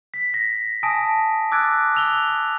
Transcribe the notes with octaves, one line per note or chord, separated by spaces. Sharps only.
B6
A#6
G#5 A5 D#6 A#6 D7
D6 E6 F#6 G#6 A6 D7
E6 F7 G7